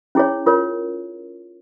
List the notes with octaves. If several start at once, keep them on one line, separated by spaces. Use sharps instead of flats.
C#4 E4 G#4 C#5
F4 A#4 C#5